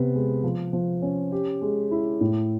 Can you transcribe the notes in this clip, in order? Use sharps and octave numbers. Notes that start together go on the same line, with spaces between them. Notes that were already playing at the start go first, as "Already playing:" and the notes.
Already playing: C3 B3
G#3
F3
F3
C#4
G4
G#3
E4
A2